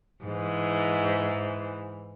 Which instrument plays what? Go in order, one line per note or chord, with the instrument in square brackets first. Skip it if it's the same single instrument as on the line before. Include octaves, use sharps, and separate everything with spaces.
[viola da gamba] G#2 E3